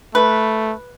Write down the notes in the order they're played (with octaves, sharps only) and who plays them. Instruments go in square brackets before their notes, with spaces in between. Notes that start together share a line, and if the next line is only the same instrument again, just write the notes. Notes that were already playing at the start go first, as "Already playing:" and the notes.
[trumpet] A3 [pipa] B4